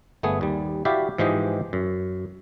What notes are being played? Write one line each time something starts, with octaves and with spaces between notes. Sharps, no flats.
G1 A3 B3 G#4
D#2 G3
E4 F#4 G4 D5 E5 F5
G#2 E3 F3 G#3 G4 D#5
F#2